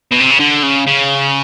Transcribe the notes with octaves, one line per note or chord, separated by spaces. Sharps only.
B2
C3
C#3
D3
C#3
C#3